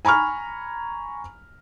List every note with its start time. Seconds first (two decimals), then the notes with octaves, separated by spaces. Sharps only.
0.05 G#5 A#5 B5 C#6 F6